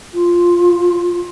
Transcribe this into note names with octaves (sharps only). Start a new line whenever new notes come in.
F4